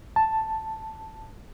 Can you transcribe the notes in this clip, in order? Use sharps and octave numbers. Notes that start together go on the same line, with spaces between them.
A5